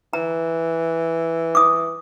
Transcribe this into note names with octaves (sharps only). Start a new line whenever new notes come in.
E3 A#5
D6 D#6